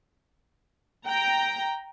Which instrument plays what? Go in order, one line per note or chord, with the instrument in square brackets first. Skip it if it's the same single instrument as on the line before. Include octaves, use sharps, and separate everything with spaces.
[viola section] G5 A#5